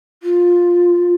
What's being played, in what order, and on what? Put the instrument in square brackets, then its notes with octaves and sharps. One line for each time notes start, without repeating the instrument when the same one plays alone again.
[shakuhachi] F4